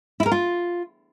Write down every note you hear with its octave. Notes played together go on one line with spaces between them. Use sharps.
E4
A#4
F4